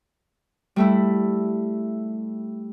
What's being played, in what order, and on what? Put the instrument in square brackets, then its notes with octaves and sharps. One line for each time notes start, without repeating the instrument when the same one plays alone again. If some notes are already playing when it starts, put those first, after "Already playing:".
[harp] G3 A3 E4